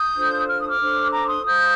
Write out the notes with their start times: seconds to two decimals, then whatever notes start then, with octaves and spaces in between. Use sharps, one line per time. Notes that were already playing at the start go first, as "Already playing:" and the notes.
Already playing: D#6 G6
0.15 D4 F4 A4 C5
0.48 F6
0.58 D#6
0.68 D6 F6
0.80 D4 A4 C5
1.12 A#5 D6
1.27 C6 D#6
1.43 F4 C5 D#6 G6